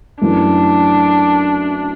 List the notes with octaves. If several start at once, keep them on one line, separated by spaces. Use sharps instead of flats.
F#2 E3 A3 D4